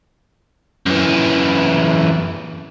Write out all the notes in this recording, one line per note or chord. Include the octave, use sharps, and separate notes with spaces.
F#2 E3